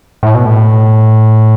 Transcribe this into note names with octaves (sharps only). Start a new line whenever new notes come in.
A2
B2
A2